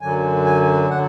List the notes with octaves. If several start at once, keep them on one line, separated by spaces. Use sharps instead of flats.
F#2 D3 F#3 G#5
G#5
D3 F#3 F#5